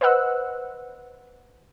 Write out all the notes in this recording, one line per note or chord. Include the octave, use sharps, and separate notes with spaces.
B4 C5 D#5 F#5 E6 F#6